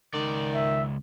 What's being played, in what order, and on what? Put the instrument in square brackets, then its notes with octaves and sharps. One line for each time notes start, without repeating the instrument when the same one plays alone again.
[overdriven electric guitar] C#2 D5 [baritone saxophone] D#3
[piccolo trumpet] E5